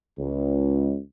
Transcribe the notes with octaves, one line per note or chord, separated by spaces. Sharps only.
C#2